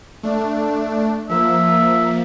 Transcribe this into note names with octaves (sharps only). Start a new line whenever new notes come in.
A3 D4
F3 A#3 E5